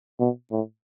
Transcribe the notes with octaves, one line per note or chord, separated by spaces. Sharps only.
B2
A2